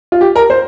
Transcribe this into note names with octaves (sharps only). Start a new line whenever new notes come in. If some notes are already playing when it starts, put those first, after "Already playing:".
F4
G4
A#4
C5